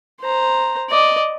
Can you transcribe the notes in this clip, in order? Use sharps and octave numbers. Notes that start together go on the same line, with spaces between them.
C5 A#5
D5 D#5